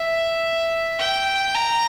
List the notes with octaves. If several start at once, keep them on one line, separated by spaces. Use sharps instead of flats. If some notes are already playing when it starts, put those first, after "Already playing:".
Already playing: E5
G5
A#5